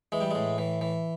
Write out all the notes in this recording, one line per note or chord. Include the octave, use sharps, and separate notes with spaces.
E3 G#3
G3
A2 G#3
E3
E3